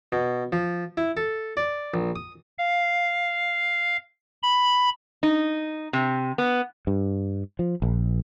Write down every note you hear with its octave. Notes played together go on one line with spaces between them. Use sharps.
B2
F3
E4
A4
D5
A#1
D#6
F5
B5
D#4
C3
B3
G2
F3
A#1